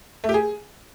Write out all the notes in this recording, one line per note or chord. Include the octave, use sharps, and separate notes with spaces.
A3
G4
G#4